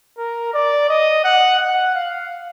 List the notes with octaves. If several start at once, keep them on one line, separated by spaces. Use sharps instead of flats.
A#4
D5
D#5
F#5
F#5
F5